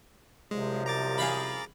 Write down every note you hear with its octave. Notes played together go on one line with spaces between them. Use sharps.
C2 F#2 C3 F3 G#3
A#5 D6 A6
G#4 F5 B5